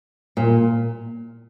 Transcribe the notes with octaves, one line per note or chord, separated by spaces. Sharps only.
A#2